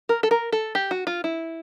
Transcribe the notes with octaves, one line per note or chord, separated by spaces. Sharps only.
A#4
A4
A#4
A4
G4
F#4
F4
E4